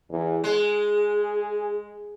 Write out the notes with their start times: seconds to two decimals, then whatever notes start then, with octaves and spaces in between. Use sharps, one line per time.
0.11 E2
0.44 G#3 G#4